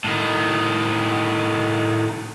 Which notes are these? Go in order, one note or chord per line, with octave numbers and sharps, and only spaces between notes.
A2 D#3